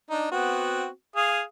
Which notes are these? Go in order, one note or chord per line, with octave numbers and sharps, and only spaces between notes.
D4 D#4
B3 C4 F#4
G#4 F5 D#6